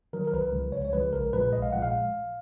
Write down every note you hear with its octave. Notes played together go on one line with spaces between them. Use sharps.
D#3 F#3 A#4
A#4
C#2 B4
C#3 F3 G#3
C#2 C#5
C#5
C#3 F3 G#3 B4
A#1 A#4
A#2 F3 G#3 B4
A#1 D#5
F5
A#2 F3 G#3 F#5
F5